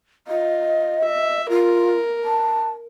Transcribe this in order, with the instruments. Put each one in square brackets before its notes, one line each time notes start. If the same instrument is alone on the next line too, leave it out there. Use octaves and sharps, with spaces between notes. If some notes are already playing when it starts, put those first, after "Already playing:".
[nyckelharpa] F4 [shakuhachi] D#5
[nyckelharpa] E5
[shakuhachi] F4 [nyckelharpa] A#4
[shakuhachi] A5